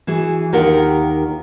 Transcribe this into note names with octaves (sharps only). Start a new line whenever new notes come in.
E3 F#4 G#4
D#2 D#3 F4 G4 A#4 F#5